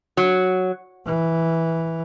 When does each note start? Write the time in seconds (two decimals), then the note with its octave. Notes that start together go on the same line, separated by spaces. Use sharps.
0.17 F#3
1.06 E3